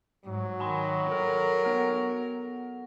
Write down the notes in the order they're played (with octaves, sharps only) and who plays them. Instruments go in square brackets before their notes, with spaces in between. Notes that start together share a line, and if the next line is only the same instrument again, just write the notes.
[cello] G#2 [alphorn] F#3
[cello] D#3 [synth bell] G#5 B5 C6
[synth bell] A4 [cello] A#4
[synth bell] B3 A4 F#5